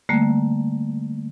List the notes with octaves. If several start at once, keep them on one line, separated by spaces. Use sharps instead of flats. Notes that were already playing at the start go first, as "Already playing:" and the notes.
D3 G3 A3 A#3